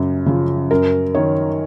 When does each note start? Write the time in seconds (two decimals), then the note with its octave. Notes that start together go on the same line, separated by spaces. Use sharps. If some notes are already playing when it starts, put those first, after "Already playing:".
Already playing: F#2 C#3
0.26 C#3 F3
0.71 F#2 A#4
1.15 D#3 C#5